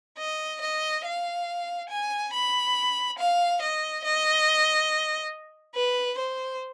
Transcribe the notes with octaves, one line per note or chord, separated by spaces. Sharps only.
D#5
D#5
F5
G#5
B5
F5
D#5
D#5
B4
C5